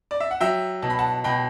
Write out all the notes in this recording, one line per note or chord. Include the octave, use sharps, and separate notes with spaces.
D5
E5
F#5
F#3 E5 G5
B2 A5
B5
F#5 A5
B2 G5 B5